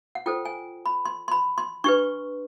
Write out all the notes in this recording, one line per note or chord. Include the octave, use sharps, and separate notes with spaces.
F#5
F4 A4 C5 G5
G#5
B5
C6
C6
B5
C6
D4 G4 B4 C#6